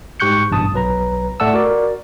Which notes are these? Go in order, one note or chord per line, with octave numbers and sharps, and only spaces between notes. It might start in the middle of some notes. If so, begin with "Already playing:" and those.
G#2 G4 C#6 F#6 G6 C#7
A1 G2 B2 A5 D#6
B1 F#3 B4 A#5
A2 A3 D5 F#5 A5 E6
F#4 A#4 D5